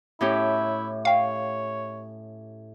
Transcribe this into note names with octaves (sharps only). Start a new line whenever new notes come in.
A2 C#4 E4 G4
C#5 F5 G5